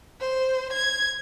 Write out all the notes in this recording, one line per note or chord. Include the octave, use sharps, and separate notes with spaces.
C5
G#6